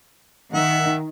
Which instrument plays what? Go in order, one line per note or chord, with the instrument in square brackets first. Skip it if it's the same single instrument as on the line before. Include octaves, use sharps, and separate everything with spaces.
[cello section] D#3 [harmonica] E5 F#5